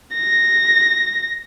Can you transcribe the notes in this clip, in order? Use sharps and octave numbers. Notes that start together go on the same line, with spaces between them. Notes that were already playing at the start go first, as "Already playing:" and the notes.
A#6